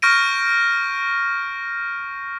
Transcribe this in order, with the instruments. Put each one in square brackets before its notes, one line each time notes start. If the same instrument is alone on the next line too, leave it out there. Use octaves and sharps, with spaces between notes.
[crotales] C#6 F6 G6 A#6 D7 D#7